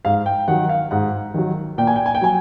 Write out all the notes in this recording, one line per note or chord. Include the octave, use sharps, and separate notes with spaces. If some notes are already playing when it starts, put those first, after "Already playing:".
G#2 F5
G5
D#3 F#3 F#5
F5
G#2 F#5
D#3 F#3
A#2 G5
G#5
G5
G#5
G5
F#3 G#5